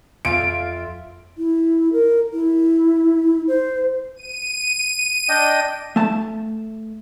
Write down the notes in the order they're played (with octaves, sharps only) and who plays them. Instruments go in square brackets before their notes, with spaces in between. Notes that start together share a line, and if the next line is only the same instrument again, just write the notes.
[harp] F2 F5 [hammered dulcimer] F4 E5 [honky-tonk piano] D7
[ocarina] E4
A#4
E4
C5
[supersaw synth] D#7
[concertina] D4 D#5 G5
[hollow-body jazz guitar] A3 A5